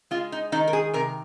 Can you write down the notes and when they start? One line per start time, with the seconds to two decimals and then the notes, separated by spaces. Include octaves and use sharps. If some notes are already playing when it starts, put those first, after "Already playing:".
0.11 G#3 F4
0.32 D#4
0.52 D#3 D#4
0.67 A#4
0.73 G#4
0.93 C3 A#4